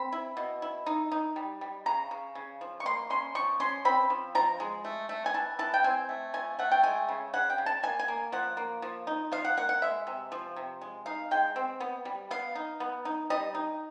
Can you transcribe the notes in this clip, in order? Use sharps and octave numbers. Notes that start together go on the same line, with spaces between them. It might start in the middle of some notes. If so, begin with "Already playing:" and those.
Already playing: C4 B5
E4
B2
E4
D#4
D#4
G3
G3
C#3 A#5
C#3
C#3
F3
C#6
A#3 C6
C#4 C6
F3 C#6
C#4 C6
C4 B5
F3
F3 A#5
G#3
A3
A3
G#5
E3 A5
E3 A5
G5
C4 G#5
A3
F3 G#5
A3 F#5
G5
G#3 G#5
C#3
C#3 F#5
G5
C#3
A5
A#3 G#5
G#5
A#3
F3 F#5
A#3
F3
D#4
F3 F5
F#5
A#3 F#5
F#5
G#3 E5
C3
F3
C3
G#3
D#4 F5
G#3 G5
C4
B3
G3
B3 F5
D#4
B3
D#4
G3 D#5
D#4